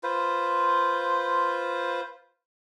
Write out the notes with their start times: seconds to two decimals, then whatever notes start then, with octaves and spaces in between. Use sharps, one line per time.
0.03 F4 B4 C5